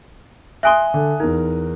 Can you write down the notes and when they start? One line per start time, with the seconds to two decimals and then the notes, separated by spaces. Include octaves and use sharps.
0.63 E5 G#5 C6 D#6 F#6 G7
0.94 D3
1.20 E2 D#4 A#4